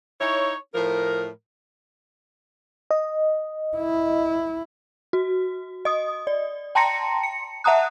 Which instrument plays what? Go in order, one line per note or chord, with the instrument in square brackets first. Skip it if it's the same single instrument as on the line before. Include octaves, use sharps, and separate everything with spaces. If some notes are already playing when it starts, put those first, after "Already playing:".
[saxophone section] D#4 E4 C#5
A2 F3 A#4
[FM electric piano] D#5
[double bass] E4
[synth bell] F#4
D#5 D#6
D5
G5 A5 A#5 C6 A#6 C#7
C#7
E5 F#5 A5 A#5 D#6 F#6